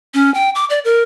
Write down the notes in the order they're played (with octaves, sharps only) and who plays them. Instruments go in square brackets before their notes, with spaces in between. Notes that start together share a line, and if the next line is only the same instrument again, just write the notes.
[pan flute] C#4
G5
D6
D5
A#4